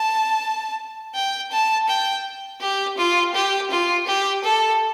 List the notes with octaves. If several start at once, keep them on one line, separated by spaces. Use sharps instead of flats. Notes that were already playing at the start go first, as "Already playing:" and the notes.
Already playing: A5
G5
A5
G5
G4
F4
G4
F4
G4
A4